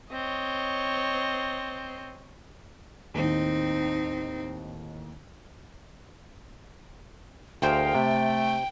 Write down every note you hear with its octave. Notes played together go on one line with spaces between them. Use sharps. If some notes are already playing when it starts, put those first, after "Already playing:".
C4 C#5 D#5
D#2 A2 D#3 C4 D#4
D2 G#4 A#4 C5 F5 G5
C3 A3